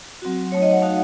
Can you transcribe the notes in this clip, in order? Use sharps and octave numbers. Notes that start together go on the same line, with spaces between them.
F#3 C4 F#4
F#3 A3 D#4 C#5
D#5
F#5
A3 D#4 F#4 F5